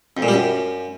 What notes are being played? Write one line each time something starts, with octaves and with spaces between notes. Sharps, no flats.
F2
A#2
G3
F#2